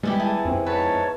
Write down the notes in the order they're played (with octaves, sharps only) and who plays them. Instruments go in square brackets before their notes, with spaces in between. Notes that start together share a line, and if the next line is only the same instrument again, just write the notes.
[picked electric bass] G3 G#3 [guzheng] B3 E4 G4
[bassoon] E4 [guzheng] G#4 [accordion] A5
[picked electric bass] F2 C4 [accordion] C3 D#3
[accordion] G#2 C#5 A5 [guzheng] B4